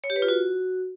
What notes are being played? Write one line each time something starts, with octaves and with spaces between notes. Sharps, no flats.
C#5
G4
B4
F4
F#4